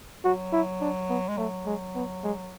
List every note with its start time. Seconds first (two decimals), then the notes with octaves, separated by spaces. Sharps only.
0.24 F#3 F#4
0.53 E4
0.81 D4
1.10 B3
1.28 G#3
1.37 F#3 A3
1.66 G#3
1.95 B3
2.24 G#3